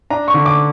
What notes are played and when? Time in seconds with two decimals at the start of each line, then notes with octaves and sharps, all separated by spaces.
0.10 D4 A#5
0.28 C#6
0.34 D3
0.46 D6